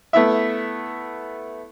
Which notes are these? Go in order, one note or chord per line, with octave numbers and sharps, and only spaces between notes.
A3 B3 E4 E5